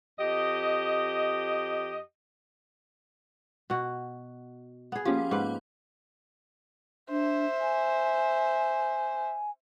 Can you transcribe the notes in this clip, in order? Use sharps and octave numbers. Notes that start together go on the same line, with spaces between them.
F2 G4 D#5
B2 F#4
B3 G#4
F3 A#3 C#4 G4
G#2 B4
D4 C5 E5
G#5